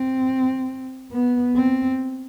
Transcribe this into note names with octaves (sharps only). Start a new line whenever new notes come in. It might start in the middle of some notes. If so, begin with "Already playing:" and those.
Already playing: C4
B3
C4